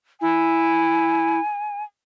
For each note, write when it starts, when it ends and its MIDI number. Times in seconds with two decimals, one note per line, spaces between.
0.21 1.39 64
0.21 1.83 80